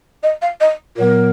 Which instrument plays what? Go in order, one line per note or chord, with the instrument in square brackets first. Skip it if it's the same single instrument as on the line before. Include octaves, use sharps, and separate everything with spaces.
[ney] D#5
F5
D#5
[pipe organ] A#2 F#3 B3 [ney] A#4